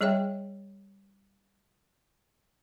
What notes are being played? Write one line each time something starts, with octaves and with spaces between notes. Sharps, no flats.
G3 G#4 C#5 E5 G5